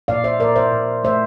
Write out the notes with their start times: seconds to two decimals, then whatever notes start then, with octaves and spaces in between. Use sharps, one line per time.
0.08 A#2 D5 F5
0.24 C5 E5
0.40 A#2 A#4 D5
0.56 C5 E5
0.72 A#2
1.04 A3 C5 E5